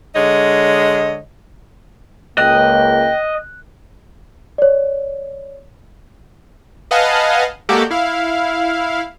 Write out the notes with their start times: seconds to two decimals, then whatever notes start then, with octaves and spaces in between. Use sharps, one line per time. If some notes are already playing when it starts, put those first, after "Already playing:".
0.15 D3 G#3 C#5 D#5
2.38 C#2 A#3 D#5 G5 F#6
4.58 C#5 D5
6.91 B4 D#5 F5 F#5 G#5 A5
7.69 G#3 A#3 F#4 G4 A4 D5
7.91 E4 F5